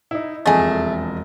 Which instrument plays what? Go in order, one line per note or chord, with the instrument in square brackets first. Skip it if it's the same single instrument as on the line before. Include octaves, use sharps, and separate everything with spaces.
[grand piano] D#4 E4
[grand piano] E1 F2 D#5 [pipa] A3 G#4